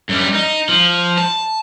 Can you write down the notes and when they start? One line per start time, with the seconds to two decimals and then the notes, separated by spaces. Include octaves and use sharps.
0.09 F#2 G3
0.34 D#4
0.69 F3
1.18 A5